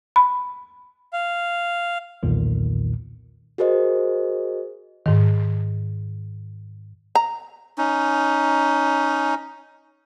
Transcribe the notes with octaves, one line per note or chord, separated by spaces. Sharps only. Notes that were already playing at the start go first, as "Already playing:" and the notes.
B5
F5
B1 E2 A#2 D#3
F#4 G#4 A#4 C5 D#5
G#2 D#3
A#5
C#4 D#4